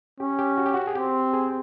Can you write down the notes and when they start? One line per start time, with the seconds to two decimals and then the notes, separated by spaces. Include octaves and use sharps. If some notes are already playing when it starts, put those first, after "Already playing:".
0.20 C#4 G4
0.39 G4
0.57 F#4
0.66 G4
0.74 F#4
0.87 G#4
0.95 C4 G4
1.34 G#4